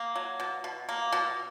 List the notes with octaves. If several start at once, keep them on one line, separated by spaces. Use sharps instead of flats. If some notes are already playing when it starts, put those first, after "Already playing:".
Already playing: A#3
F#3
B2
B2
A#3
B2